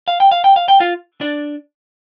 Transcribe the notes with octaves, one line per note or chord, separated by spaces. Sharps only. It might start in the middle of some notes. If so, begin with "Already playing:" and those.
F5
G5
F5
G5
F5
G5
F4 F5
D4 D5